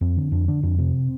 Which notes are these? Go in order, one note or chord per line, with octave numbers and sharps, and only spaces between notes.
F2 C4
D3
F2 D4
D3 D4
F2 D4
C3 C4